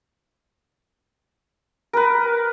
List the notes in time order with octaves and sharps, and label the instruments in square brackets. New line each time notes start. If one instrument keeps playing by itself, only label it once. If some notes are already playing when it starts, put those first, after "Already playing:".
[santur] A#4 B4